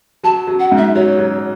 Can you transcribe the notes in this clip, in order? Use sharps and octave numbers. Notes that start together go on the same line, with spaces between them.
F#3 A5
F#3
F#5
G#2
E5
F#3 C#5
F#3